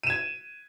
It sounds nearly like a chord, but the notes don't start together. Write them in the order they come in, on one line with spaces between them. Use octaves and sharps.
D#7 E7 G#6